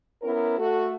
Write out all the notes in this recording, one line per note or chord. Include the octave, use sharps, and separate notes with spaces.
B3 C#4 E4 A#4
A3 F#4 A4